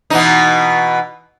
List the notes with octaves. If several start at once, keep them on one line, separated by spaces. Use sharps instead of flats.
B2 E3 D#4